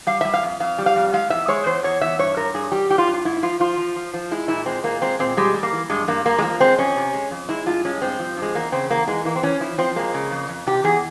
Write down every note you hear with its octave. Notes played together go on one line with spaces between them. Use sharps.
G3 F5
G3 E5
F5
F2
F2 F5
G3
F5
F2
G#3 F5
E2 E5
G#3 C#5
E2 C5
E2 C#5
E2 E5
G2 C#5
G2 A#4
G2 G#4
G3 G4
G3 G4
F4
G2
F4
G#2 E4
E4
F3 F4
F3 F4
F3
F3
F3
G#3 E4
A#2 E4
G#3 C4
A#2 A#3
G#3 C4
A#2 C4
G3 G#3
G3
A#3
E3
G2 G#3
G2 A#3
G2 A#3
G#3
F3 A#3
G#3 C4
F2 C#4
C3
G#3
F2
G#3 E4
G2 F4
G#3 C#4
G2 C4
F3
G2
G#3
E2 A#3
C#3 C4
E2 A#3
E3 G#3
E3 A#3
C4
E3 C#4
F3 E4
F3 C4
G#3 A#3
C#3
F2
F2
C3 G4
E2 G#4